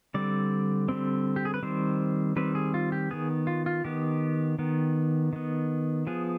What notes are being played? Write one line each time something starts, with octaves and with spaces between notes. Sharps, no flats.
D3 G3 C4 D5
D3 G3 C4
G4
G#4
B4
D#3 G3 C4 C5
D#3 G3 C4 B4
G#4
F4
G4
D#3 B3 G#4
F4
F4
D#3 B3 G4
D#3 B3
D#3 B3
F3 B3 G#4